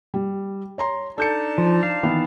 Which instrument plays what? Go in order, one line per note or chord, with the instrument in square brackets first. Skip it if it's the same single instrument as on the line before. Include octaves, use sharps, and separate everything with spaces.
[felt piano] G3
C#5 A#5 C6
[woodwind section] D4 D#4 A5 [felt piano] A4 G6 C#7
[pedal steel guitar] F3
F5
[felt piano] D#3 E3 B3